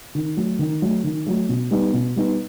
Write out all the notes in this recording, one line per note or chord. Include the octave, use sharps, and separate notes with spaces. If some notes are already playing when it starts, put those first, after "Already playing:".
D#3
F#3 A3
D#3
F#3 A3
D#3
F#3 A3
B2
G3 B3 D#4
B2
G3 B3 D#4